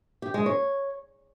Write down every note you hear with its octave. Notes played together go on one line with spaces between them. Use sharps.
G4
G#3
C#5